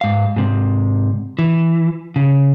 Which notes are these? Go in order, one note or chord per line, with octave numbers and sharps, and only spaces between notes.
G#2 F5
G#2 C3
E3
C#3